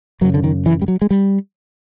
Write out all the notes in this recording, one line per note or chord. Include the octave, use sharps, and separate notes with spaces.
F#2 C#3 F#3
D3
D#3
E3
G3
F#3
G#3
G3